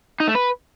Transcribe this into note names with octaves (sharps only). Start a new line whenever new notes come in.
D#4
A3
B4